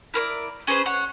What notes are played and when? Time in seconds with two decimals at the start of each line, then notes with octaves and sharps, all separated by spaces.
0.14 E4 A#4 C5 D5
0.67 C#4 G#4 B4 C5
0.86 C#5 F#5